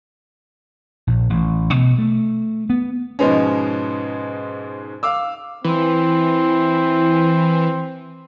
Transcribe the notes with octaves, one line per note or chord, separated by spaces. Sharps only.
A#1
A1
B2
A3
B3
G#2 B2 F3 G#3 B3 C#4
F5 D6 E6
E3 C4